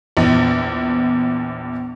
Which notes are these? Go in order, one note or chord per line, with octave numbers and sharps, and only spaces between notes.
A#1 E2